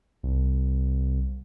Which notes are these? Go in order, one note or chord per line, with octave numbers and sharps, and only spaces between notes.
C2